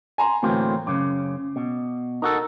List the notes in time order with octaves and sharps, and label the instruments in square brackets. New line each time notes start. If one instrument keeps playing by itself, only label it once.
[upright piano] G#5 A#5 C6
[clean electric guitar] D2 A#3 C4 [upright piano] A2 E3 F#3
[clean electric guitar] F#2 C#3 [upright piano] D6
[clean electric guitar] B2
[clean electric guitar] D#4 F#4 A4 [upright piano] A#4